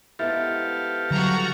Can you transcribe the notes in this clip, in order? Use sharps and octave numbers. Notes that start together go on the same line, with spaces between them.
G#2 B3 E4 G4 A4 F5
D3 F#3 G3 F#4 A#5